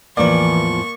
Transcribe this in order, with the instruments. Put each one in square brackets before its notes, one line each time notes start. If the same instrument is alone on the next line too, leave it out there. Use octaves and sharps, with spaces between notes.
[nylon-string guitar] E2 A2 F3 [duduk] E3 [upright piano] A#3 D5 [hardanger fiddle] C#6